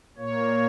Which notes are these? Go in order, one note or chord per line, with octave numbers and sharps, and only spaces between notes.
A#2 A#3 C#5